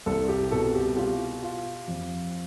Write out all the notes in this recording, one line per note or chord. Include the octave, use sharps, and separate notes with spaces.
C2 A4
G4
B2 A4
G4
F4 G4
F4
F2